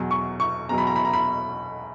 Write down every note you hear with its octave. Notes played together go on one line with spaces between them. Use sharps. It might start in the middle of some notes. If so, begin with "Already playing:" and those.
Already playing: E2 B2 F#3
C#6
C#6
E2 B2 F#3 A#5
B5
A#5
B5
A#5
B5